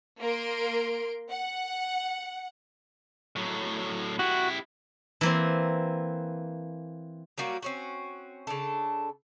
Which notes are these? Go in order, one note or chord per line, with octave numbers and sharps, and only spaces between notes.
A#3 A#4 C6 D7
F#5
A2 F#3
E4 F#4 G4
E3 A#3 C4
F#3 G3 A#3 F#4
C4 C#4 F#4
C#3 D4 A4